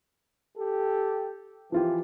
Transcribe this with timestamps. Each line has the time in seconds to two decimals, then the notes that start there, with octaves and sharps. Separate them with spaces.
0.56 G4 A4
1.72 E3 F3 F4 G4